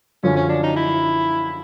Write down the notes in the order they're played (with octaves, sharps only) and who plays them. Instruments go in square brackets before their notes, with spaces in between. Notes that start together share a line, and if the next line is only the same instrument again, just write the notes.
[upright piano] F#2 D3 F3 [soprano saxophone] C#4
[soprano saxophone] C#4
D4
D#4
E4